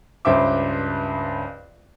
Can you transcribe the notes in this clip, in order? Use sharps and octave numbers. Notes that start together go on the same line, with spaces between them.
C#2 G2 C5 E5 D6